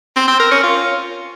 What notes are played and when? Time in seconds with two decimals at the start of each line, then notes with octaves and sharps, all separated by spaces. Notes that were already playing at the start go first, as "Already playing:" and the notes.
0.16 C4
0.28 C4
0.39 A#4
0.51 C#4
0.63 F4